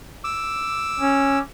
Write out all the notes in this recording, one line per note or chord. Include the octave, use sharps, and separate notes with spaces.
D6 E6
C#4